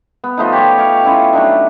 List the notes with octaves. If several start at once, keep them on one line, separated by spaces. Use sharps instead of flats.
B3
F3 A3 D#4
G4 C#5
C#5 F5 G5
C#4 E4 F4
F#3 A3 D4 D#4